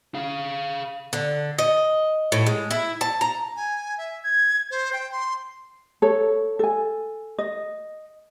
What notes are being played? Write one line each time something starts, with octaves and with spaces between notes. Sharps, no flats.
G#4 F5
D3
D#5
A2
G#3
E4
A5
A#5
G#5
E5
G#6
C5
G5
C6
A4 C#5
A4 G#5
D#5